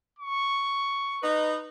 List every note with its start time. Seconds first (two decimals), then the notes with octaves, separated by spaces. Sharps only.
0.19 C#6
1.22 D#4 B4